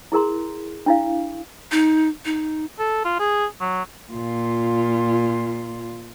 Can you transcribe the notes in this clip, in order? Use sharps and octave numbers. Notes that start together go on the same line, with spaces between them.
E4 G#4 A#4 A#5 C6
D4 E4 F5
D#4
D#4
A4
F4
G#4
F#3
A#2 F4